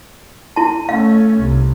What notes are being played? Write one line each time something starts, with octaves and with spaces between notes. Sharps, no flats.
E4 A5
A3 C#4 F5
C2